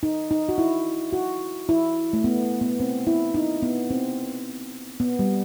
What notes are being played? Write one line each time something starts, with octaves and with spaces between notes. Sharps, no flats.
D#4
D#4
F#4
E4
F#4
E4
A3
B3
B3
C4
E4
D#4
B3
C4
B3
G3